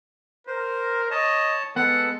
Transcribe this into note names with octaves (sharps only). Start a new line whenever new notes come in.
A#4 C5
C#5 D#5 A5
G#3 B3 A4 F#5